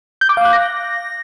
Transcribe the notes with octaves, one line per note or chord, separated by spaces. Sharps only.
G6
D6
F5
F#6
A#6